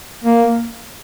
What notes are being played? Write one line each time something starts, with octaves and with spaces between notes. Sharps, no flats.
A#3